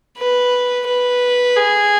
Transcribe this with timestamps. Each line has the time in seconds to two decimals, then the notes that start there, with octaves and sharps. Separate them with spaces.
0.18 B4
0.87 B4
1.57 G#4